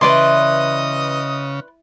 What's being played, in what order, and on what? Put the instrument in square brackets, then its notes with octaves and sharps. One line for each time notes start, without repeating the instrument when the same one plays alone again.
[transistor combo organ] C#3 [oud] E3 [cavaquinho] B4 D5 C6 [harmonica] D#5 D#6